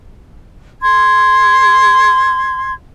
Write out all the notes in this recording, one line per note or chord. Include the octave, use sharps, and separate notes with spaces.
C6 G#6